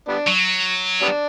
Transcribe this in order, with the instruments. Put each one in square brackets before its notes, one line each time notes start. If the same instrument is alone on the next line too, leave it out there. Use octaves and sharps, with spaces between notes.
[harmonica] G3 B3 D4
[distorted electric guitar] F#3
[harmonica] G3 B3 D4